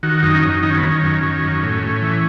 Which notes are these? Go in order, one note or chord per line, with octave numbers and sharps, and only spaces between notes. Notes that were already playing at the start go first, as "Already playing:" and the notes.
D#3 F#4
F#2 D#4
C#4
F#2 D#4
D#3 D#4
C#4
B3
D#3 C#4
F#2
D#3
F#2
A2
A2
E3